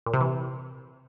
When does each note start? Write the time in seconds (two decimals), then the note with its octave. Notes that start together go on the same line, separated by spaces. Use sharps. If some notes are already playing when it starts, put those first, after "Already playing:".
0.06 A#2
0.14 C3
0.21 E3